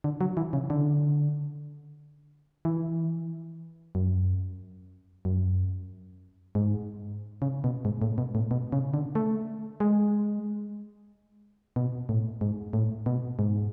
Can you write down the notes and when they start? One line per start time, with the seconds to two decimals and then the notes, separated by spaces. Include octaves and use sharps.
0.04 D3
0.21 F#3
0.37 E3
0.53 C#3
0.70 D3
2.65 E3
3.95 F#2
5.25 F#2
6.55 G#2
7.42 C#3
7.64 B2
7.85 G#2
8.02 A2
8.18 B2
8.35 A2
8.51 B2
8.72 C#3
8.94 D3
9.15 A3
9.80 G#3
11.76 B2
12.09 A2
12.41 G#2
12.73 A2
13.06 B2
13.39 G#2